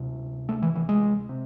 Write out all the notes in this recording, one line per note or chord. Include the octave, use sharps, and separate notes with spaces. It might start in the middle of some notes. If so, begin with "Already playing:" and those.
Already playing: D2 C3
A3
E3
E3
G#3
C3